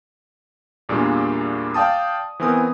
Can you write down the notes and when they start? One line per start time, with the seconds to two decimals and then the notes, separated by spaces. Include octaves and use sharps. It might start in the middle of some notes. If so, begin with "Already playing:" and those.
0.89 E2 A#2 G3 G#3 A#3 D4
1.74 D5 F5 G5 A5 D#6
2.40 E3 B3 C4 A#4 G#5 D#6